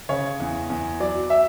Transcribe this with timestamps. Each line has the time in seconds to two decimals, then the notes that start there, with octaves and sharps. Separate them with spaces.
0.09 C#3 C#5
0.40 E2
0.70 E2
1.00 F#3 D5
1.30 E5